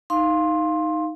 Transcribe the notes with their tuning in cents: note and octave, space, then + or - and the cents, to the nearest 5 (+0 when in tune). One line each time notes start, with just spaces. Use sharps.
D#4 +5 F5 +0 C6 +15